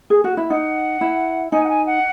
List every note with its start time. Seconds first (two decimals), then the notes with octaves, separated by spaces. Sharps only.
0.10 G#4
0.24 F#4
0.37 E4
0.49 D#4 F#5
1.01 E4
1.52 D#4 G#5
1.64 F#5
1.69 G#5
1.86 F#5